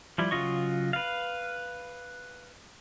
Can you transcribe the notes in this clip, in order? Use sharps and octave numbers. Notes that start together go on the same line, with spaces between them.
F3 G3 E4
C#3 F#3 F4 D#5 C#6
B4 F5